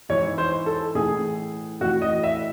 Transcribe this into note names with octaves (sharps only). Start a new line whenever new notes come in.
G#2 E3 C#5
C5
A4
A2 E3 G#4
A2 E3 F#4
D#5
E5